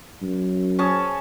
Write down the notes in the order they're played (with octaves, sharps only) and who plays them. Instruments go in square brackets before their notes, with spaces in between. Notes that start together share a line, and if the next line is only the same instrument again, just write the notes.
[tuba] F#2
[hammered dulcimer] C#4 G#4 A5